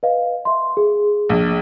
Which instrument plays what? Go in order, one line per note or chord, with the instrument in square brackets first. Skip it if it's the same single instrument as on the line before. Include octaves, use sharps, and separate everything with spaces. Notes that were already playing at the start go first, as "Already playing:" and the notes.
[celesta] B4 D#5 F5
E5 C6
G#4
[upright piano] A#1